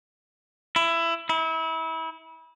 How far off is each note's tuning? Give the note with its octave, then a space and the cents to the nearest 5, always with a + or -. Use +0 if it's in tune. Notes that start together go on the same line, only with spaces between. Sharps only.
E4 +20
E4 -30